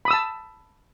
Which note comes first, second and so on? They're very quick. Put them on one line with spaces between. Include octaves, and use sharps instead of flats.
B5 D#6 E6 A5